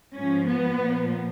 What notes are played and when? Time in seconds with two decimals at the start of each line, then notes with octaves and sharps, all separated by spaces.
0.14 G#2 F3 C#4
0.46 B3
0.79 A#2 F3